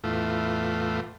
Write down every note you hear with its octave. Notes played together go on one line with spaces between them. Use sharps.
E2 A2 A3 F4